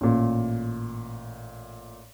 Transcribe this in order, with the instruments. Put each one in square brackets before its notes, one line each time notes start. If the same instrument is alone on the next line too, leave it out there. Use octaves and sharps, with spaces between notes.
[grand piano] A1 A#2